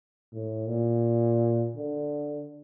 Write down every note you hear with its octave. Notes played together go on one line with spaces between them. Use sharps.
A2
A#2
D3